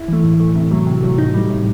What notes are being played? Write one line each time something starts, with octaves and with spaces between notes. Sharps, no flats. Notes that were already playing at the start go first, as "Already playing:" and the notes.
Already playing: E4
E3 A3
A2
E3 A3
C3
F#3 A3
C3
F#3 A3
A2 D#4
G3
A2